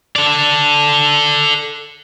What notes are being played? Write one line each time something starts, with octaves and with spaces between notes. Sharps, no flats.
A4 D5